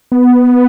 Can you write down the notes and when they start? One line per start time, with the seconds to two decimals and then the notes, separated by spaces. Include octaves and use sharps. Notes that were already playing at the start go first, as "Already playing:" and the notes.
0.12 B3